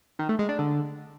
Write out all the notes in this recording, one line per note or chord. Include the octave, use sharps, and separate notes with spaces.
D#3
A3
G#3
D4
D3